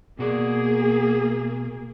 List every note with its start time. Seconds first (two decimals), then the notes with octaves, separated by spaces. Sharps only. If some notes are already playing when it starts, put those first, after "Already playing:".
0.19 B2 A#3 F#4 G#4 D5